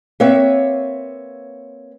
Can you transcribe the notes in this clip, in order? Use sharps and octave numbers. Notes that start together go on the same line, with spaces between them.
A#3 C4 B4 C#5 E5